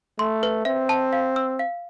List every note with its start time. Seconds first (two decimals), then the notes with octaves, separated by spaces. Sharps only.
0.19 A3 C6
0.43 B4
0.65 C4 E5
0.89 A5
1.13 F5
1.36 E6
1.59 F5